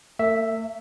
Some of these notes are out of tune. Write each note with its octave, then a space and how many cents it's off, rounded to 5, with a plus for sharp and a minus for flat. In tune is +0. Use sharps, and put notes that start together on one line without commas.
A3 +45 E5 +0